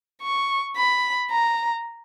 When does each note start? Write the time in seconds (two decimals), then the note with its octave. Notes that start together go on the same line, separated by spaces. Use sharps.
0.23 C#6
0.77 B5
1.31 A#5